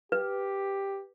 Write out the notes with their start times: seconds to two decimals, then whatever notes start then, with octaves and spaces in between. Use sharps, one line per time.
0.12 G4 B4